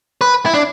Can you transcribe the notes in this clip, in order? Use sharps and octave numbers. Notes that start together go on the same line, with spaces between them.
B4
E4
D4